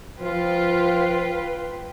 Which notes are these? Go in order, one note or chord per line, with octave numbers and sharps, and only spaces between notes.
F3 F4 B4 G5